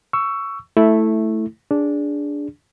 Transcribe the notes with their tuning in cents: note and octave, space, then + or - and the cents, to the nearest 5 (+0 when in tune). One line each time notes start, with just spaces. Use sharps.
C#6 +10 E6 +15
A3 +0 E4 -5
D4 -10 G#4 -10